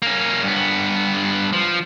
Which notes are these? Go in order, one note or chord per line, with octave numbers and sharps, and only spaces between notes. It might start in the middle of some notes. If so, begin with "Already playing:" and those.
A#3 C#4
G2 B3
F3